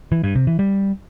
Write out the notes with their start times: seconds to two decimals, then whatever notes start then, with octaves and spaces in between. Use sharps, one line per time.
0.12 E3
0.24 G2
0.35 C3
0.47 E3
0.59 G3